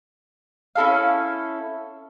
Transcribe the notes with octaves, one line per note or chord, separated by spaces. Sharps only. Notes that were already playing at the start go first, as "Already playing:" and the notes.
C#4 E4 A4 F5